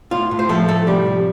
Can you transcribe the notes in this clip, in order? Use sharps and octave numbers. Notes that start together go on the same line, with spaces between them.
A2 F4
A2
C5
F3 A3 A4
A2 A3 A4
C3 G3 G4
F3